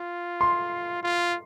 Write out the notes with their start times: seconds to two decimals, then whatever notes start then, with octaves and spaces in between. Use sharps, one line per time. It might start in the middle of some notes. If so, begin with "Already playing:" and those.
Already playing: F4
0.41 C6
1.03 F4